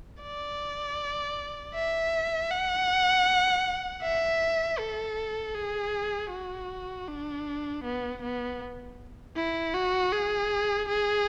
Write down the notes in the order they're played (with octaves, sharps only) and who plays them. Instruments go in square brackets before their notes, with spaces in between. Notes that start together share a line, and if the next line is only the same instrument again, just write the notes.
[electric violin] D5
E5
F#5
E5
A4
G#4
F#4
D4
B3
B3
E4
F#4
G#4
G#4